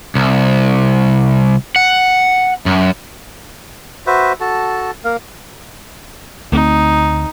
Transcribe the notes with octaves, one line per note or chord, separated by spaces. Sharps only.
C2
F#5
F#2
F#4 B4 C5 E5
F#4 A4 A5
A#3 A#4 F5
D2 A3 C4 D#4